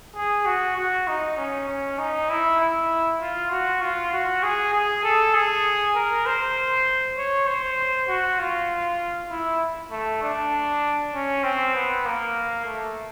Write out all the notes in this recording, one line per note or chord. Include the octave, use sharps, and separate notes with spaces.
G#4
F#4
F#4
D#4
C#4
C#4
D#4
E4
E4
F4
F#4
F4
F#4
G#4
G#4
A4
G#4
A#4
C5
C#5
C5
F#4
F4
E4
A3
D4
C#4
C4
B3
A#3
A3